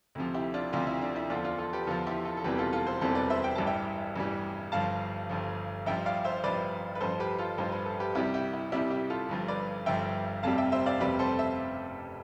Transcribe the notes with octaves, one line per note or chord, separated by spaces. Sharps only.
D2 C3 F3
E4 G4
D4 F4
D2 C3 F3 D4 F4
E4
D4
E4
E2 D3 F3 D4 F4
D4 F4
F4 A4
G4 B4
E2 D3 F3 F4 A4
E4 G4
F4 A4
A4
E1 E2 C3 E3 G3 G4 B4
F4 A4
F4 A4
A4 C5
E1 E2 C3 E3 G3 A4 C5
B4 D5
C5 E5
G5
A1 G2 E3 G3 A5
E5 G5
A1 G2 E3 G3
G1 G2 F3 F5 A5
G1 G2 F3
A1 G2 F3 E5 G5
D5 F5
C5 E5
A1 G2 F3 B4 D5
B4
A1 G2 F3 A4 C5
G4 B4
F4 A4
A1 G2 F3 C5
B4
A4
G4 B4
C2 C3 G3 E4 G4
E4 G4
E4
C2 C3 G3 E4
E4 G4
F4 A4
G1 G2 F3
B4 D5
G1 G2 F3 E5 G5
F1 F2 C3 G3 F5 A5
E5 G5
C5 E5
D5 F5
F1 F2 C3 G3 B4 D5
A4 C5
E5